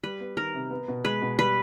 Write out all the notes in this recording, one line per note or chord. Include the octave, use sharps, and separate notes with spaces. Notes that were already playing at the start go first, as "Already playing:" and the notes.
G3 B4
B3
D#3 A#4
C3
B3
B2
G#3 B4
B2
G3 B4